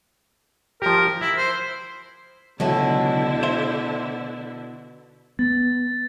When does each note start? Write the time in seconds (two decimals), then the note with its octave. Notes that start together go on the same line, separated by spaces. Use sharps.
0.82 F3 G4 A#4
1.21 E4 E5
1.37 C5
2.60 C#2 B2 D3 F#3 A3 E4
3.43 C5 E5
5.39 B3 A6